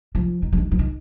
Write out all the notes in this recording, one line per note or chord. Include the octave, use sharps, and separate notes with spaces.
F3
D#3
F3
D#3
F3
D#3